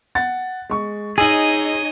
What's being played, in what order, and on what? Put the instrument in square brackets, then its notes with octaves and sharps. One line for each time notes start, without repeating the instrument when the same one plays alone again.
[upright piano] F#5 A6
G#3 C#6
[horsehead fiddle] D#4 C#5 [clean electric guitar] G#4 [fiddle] D#5 G#5 [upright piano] E6 F#7